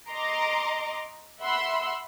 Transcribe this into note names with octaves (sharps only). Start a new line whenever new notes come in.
D#5 A#5 C6 D6
E5 F#5 B5 C6 E6